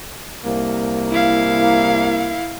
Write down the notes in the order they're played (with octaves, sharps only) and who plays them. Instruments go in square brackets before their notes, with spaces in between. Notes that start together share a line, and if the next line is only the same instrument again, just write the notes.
[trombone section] C2 A#3
[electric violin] E4 F5